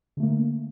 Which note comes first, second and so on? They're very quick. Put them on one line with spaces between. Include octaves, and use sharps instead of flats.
D3 A3 A#3